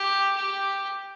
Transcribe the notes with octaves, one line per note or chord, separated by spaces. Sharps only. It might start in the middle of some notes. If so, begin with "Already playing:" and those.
Already playing: G4
G4